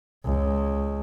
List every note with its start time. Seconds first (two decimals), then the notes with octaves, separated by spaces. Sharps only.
0.24 C#2